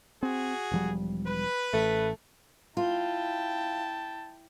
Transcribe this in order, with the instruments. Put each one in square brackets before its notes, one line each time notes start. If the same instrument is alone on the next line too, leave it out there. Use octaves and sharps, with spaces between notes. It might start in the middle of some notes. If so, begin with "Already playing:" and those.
[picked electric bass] C4 [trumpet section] F#4 G#4
[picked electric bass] E1 F3 G3
[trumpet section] B4
[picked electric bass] A1 [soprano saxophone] A3
[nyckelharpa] E4 G5 [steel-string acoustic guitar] F4 [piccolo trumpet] A5